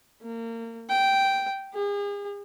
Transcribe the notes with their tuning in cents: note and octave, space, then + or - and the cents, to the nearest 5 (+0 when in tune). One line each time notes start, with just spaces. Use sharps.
A#3 -30
G5 -5
G#4 -40